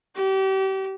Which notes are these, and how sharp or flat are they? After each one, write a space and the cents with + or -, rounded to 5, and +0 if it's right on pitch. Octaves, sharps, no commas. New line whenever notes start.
G4 -35